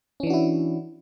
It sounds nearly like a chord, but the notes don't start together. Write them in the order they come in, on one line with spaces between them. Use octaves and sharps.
C#4 E3 D4 F#4 E4